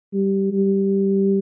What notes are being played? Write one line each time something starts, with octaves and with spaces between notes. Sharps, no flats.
G3
G3